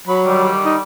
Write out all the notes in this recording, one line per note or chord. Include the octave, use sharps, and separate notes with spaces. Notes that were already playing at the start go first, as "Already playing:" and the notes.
F#3 B5
D3 D#3 G3
D#4